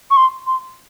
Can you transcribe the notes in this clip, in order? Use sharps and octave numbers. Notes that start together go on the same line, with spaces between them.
C#6
C6
C6